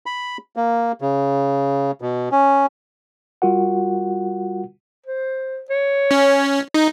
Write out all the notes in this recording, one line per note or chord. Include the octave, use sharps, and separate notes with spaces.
B5
A#3
C#3
B2
C#4
G3 F4 F#4 A#4 F#5
C5
C#5
C#4
D#4